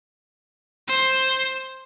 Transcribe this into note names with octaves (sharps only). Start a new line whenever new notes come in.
C5